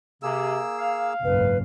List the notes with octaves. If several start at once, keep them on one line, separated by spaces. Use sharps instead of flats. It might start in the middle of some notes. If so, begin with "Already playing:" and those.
C3 A#3 G#4 E6
F5
F#1 B1 G#2 B4